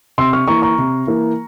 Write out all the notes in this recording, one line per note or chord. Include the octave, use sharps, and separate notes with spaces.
C3 C6 E6
C#6 F6
E3 A#3 A#5 C#6
A#5 C#6
C3
E3 A#3